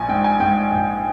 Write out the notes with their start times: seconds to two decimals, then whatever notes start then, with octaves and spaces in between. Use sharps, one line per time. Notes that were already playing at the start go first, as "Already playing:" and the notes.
Already playing: A#1 G#5
0.09 G#2 G5
0.24 G#5
0.40 G#2 G5
0.71 A#1